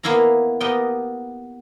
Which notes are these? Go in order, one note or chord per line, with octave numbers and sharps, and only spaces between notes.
A#3 B3 E4 F5 A#5
B3 G4 A#4 D#5 G5